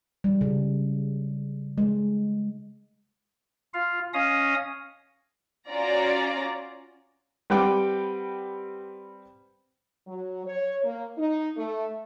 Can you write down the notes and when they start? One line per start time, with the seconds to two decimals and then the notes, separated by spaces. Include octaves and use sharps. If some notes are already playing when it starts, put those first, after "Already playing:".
0.24 G3
0.41 C#3
1.78 G#3
3.74 F4 F5
4.14 C#4 D#5 F5 D#6
5.68 C#4 F4 F#4 D5 A#5
7.50 G3 C4 B4 F#5 G5 D6
10.07 F#3
10.45 C#5
10.84 A#3
11.18 D#4
11.57 A3